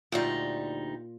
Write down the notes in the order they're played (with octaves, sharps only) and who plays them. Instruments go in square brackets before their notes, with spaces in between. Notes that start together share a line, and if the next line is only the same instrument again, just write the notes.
[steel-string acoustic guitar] D2 G3 D#4 [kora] A#2 F4